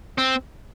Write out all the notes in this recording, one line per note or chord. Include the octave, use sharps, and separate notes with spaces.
C4